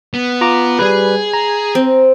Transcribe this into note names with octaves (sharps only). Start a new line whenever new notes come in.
B3
F4 A#5 D6
G3 G#4 B4
A#5
C4